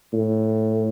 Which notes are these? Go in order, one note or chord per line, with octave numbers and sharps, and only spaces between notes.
A2